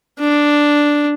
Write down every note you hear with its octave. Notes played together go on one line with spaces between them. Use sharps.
D4